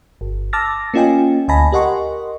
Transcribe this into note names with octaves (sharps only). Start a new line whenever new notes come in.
G1
A5 D6 E6 F6 A6 A#6
A#3 C#4 F4 D#5 G5 G#5
D2 D#5 G#5 A5 B5 A#6
G4 A#4 D#5 F#5 C6 C#6